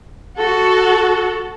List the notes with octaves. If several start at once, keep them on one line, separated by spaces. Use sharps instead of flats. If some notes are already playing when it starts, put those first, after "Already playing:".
F#4 A4